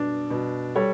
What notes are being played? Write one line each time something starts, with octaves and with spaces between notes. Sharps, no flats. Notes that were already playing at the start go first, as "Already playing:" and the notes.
Already playing: B2 D4
B2
G3 A4 C#5